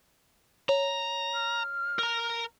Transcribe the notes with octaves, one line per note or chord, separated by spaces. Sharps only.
C#5 A#5
F6
A#4 A#5